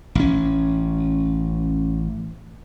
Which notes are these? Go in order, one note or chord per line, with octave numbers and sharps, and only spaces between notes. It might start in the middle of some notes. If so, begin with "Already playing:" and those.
A1 C#4